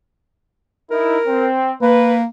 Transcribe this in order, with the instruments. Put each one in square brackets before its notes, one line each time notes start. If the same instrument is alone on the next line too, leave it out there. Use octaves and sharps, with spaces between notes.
[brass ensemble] D#4 E4 [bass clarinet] A#4
[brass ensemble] C4
[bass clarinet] A#3 [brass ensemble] B4